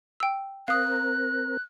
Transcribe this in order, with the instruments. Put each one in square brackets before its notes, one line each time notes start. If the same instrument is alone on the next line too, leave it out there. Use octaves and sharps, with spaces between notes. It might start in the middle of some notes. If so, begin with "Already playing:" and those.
[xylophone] G5 E6
[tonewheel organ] C4 A#4 [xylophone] F5 D#6 [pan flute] F#6